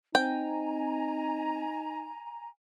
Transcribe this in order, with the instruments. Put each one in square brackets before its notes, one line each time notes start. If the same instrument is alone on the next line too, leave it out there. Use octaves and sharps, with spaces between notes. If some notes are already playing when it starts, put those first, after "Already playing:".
[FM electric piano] C4 [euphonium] D#4 [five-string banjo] G5 [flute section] G#5 A#5